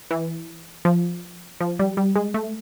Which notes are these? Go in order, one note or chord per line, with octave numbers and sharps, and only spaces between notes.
E3
F3
F3
G3
G3
G#3
A3